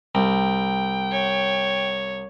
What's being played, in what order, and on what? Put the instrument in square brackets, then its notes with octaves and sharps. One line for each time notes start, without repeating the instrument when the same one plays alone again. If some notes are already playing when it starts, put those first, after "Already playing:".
[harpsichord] C2 [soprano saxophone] G5
[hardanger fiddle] C#5